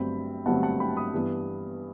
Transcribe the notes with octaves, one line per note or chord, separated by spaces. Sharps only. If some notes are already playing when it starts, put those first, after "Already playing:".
Already playing: G1 G2 F#3 A3 C4 G5 B5
G1 G2 F#3 A3 C4 F#5 A5
F#5 A5
G5 B5
B5 D#6
G2 E3 B3